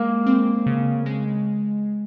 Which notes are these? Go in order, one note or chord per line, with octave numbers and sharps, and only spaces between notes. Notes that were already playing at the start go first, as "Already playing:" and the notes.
Already playing: G#3 A#3
C4
C#3
G#3